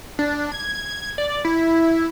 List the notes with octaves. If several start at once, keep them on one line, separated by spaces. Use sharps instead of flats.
D4
G#6
D5
E4